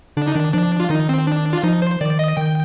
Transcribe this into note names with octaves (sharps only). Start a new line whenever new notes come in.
D3 D4
D#4
D#3 D4
F3 D4
F4
D#3 D#4
C4
D4
F4
F3 D#4
C5
D#3 D5
D#5
D#3 G5